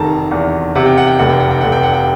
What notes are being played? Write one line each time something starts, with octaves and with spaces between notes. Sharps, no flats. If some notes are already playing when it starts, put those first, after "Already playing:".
Already playing: F1 C3 D#3 A5 A#5
E2
C3 F#5
G5
F#5
G5
F1 F#5
G5
F#5
G5
F1 F#5
G5
F#5
G5